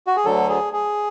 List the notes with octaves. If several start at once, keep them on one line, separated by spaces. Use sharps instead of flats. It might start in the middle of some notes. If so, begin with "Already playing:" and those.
F#4
G#4
D2 D3 F#3 A4
G#4
G#4